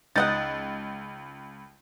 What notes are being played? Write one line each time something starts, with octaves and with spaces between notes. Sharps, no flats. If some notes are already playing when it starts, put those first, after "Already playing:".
C#2 D#4 D#5 F#5 A6